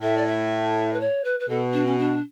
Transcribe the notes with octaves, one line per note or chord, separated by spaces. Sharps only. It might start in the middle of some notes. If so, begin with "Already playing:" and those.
A2 E5
D5
E5
B4
C#5
B4
B4
B2 A4
D4
C#4
D4